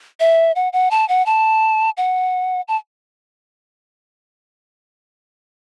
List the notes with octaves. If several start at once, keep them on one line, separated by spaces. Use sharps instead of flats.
E5
F#5
F#5
A5
F#5
A5
F#5
A5